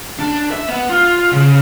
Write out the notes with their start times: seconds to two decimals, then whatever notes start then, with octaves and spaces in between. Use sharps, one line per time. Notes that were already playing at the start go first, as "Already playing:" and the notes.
0.19 D4
0.51 E5
0.69 B3
0.90 F4
1.32 C#3